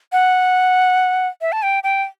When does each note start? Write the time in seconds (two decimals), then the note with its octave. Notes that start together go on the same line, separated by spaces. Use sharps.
0.12 F#5
1.41 E5
1.52 A5
1.63 G5
1.84 G5